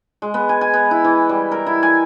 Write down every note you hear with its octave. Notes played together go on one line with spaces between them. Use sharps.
G#3
B3
G#5
G#5
B3
E4
E3
G3
A#4
E4
G#5